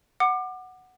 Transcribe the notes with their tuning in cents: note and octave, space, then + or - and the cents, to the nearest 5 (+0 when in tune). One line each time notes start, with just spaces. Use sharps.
F#5 +0 D6 +30